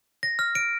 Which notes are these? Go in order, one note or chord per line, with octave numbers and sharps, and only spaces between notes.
A#6
F6
D7